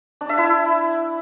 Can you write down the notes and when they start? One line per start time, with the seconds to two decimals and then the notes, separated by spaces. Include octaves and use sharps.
0.21 D4
0.29 E5
0.38 E4